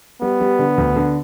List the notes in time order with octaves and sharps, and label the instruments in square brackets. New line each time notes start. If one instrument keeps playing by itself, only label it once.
[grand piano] G3 [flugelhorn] B3
[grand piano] G3
D3
D2
D3